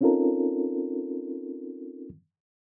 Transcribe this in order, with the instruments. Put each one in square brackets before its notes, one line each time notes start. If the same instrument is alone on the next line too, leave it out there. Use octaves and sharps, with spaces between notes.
[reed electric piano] C4 C#4 D#4 F4 A4 A#4